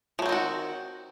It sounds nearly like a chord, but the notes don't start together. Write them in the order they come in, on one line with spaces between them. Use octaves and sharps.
F3 F#3 C4 D#3 F#4